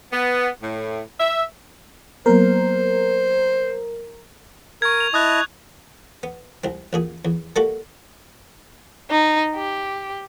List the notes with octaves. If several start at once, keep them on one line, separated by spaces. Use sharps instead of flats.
B3
A2
E5
F#3 A#3 B3 A#4 C5
A#4 C#6 G#6
F7
E4 D#5 A5 D#6 F#6
B3
C2 C4
A1 A#2 G#4
E2
G3 A3 A#3 F#4 A4
D#4
G4